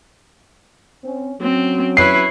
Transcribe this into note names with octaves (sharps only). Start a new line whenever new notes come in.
C4 C#4
F#3 C4 C#4
E4 B4 C#5 C7